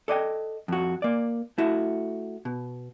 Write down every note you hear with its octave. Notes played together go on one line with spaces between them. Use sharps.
A4 D5 D#5 G5
F2 F#4
A#3 D5
A3 E4 F#4
B2